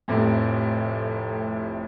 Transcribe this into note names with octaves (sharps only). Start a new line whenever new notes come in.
F1 F2 A2 C3